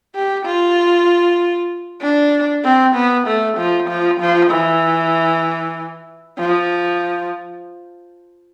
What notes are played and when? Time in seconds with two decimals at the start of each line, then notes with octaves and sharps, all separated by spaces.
0.15 G4
0.46 F4
2.01 D4
2.64 C4
2.95 B3
3.27 A3
3.58 F3
3.89 F3
4.20 F3
4.51 E3
6.38 F3